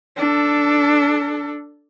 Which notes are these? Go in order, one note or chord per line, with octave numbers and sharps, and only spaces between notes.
D4 A4